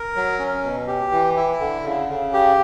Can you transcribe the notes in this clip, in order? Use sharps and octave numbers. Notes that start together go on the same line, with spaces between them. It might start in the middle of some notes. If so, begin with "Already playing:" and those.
Already playing: A#4
F#3
C#4
B2
G4
E3
E4
D3
C#3
C#3
G4